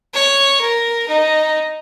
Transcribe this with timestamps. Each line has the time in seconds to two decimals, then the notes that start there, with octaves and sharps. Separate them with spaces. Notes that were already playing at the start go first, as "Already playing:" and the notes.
0.14 C#5
0.61 A#4
1.08 D#4